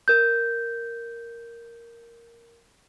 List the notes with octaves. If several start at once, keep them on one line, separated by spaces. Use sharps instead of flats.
A#4 G6